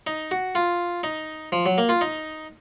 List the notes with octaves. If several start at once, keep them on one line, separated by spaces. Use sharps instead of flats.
D#4
F#4
F4
D#4
F3
F#3
A#3
F4
D#4